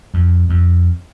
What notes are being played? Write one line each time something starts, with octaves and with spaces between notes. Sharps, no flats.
F2
F2